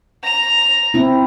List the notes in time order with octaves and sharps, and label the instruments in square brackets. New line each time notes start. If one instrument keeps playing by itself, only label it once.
[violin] A#5 F7
[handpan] C4 E4